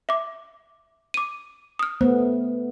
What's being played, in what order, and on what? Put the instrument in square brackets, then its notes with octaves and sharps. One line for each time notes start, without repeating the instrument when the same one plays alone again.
[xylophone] E5 D6
D6 D#7
D#6 F6
[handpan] A3 B3 [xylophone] C5